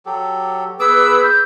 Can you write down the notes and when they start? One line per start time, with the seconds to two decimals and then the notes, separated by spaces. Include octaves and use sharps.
0.06 F#3 G4 A4
0.79 B3 G#4 B4 D6 E6
1.24 G6